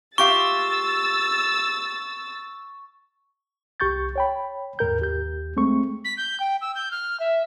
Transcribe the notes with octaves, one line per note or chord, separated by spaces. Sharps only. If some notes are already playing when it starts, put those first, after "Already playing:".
F4 G4 F5 C#6 E6 A6
C2 G4 C#6 G6 A6
C#5 G5 B5
D#2 G#2 A#4 G6
D#2 G4 G6
G#3 A3 C4 C#6
B6
G6
G5
E6
G6
F6
E5